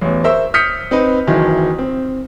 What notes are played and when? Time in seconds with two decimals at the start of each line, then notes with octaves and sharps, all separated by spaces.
0.01 A1 E2
0.24 A#4 C5 E5 C#6 E6
0.54 D#6 F6 G6 B6 C#7
0.91 C4 D#4 B4
1.27 F#1 D#3 E3 F#3
1.79 C4